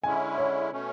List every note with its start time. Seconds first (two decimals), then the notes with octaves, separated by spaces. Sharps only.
0.04 D3 G#3 C#4 E4 G#5
0.38 C#5
0.71 B2 A3 C#4